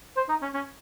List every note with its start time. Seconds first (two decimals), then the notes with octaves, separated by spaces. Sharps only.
0.16 C5
0.29 D#4
0.42 C#4
0.54 C#4